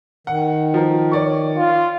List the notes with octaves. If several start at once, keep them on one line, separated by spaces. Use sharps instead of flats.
D#3 F#5
F3 A#4
C#5 D5 C#6
F4